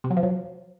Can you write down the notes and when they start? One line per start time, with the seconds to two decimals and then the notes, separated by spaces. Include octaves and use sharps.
0.04 C3
0.10 F#3
0.17 F3
0.23 F#3